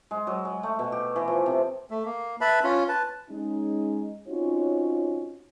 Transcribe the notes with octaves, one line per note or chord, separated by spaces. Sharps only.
G#3
F#3
G#3
A3
B2
G4
E3
F3
C3
A3
A#3
B4 E5 A5 B5
C#4 F4
B4 A5
G#3 C#4 D#4
C4 C#4 D#4 F4 F#4 C#5